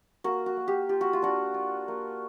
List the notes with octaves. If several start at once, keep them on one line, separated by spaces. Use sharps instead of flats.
A#3 F#4
F#4
A#3
G4
F4 G4
F#4
F4
D4 F#4
F4
A#3